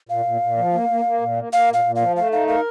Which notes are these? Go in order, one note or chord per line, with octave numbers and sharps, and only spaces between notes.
A#2 F5
A#2
A#2
F3
A#3
A#3
A#3
A#2
A#3
A#3 F5
A#2
F5
A#2
F5
F3
A3 F5
D#4 F5
A#4 F5